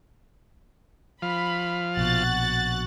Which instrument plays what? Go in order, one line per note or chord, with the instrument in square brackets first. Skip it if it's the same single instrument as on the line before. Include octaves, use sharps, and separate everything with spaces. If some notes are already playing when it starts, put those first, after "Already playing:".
[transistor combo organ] F3 F5 [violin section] B5
[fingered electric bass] A#1 B2 [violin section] F#4 F#6 A6